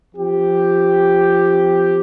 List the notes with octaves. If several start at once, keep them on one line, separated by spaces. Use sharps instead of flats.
F3 C4 G4